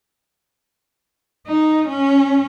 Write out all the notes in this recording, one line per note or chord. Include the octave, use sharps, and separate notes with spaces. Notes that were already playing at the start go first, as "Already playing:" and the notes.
D#4
C#4